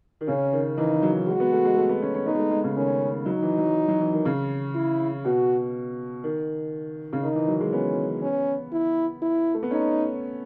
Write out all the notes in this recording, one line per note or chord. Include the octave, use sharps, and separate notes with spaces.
D#3
C#3 C#4
D#3
E3 D#4
E3
F#3
G#3 F#4
B3
A3
G#3
A3
B3
C#4
C#4
B3 D#4
G#3
A3
G#3
C#3
D#3 C#4
F#3 D#4
E3
F#3
F#3
E3
D#3
C#3
E4
B2 F#4
D#3
C#3
D#3 D#4
E3
F#3
G#3
B3 C#4
C#4
E4
E4
A3
B3
C#4 D#4